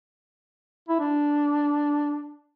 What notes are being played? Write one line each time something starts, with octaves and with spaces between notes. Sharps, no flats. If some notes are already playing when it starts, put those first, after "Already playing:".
E4
D4